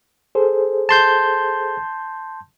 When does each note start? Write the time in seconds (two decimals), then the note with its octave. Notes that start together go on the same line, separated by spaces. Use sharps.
0.35 G#4 A4 C5
0.89 A5 C6 G6